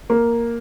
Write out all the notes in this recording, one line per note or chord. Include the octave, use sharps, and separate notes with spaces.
A#3